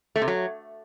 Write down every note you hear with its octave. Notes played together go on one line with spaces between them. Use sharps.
A3
C3
F#3